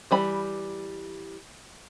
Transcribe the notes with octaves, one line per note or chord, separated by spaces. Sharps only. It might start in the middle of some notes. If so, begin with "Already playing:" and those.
E3 G3 B5